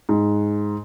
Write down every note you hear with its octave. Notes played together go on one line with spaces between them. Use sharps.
G#2